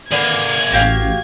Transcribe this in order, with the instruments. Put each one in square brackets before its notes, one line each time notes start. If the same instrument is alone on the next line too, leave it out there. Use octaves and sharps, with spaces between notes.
[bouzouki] D3 B4 F5 [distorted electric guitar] A#3 G#4 [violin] G#6
[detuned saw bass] A1 [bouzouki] F#4 G4 F5